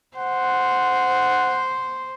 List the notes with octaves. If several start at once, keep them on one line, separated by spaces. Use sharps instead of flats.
C5 F#5